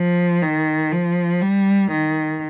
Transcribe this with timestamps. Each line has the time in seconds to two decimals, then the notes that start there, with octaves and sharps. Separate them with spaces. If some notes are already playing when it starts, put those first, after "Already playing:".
Already playing: F3
0.42 D#3
0.92 F3
1.42 G3
1.92 D#3